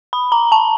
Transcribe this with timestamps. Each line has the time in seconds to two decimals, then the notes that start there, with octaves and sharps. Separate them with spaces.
0.13 B5
0.32 A#5
0.52 A5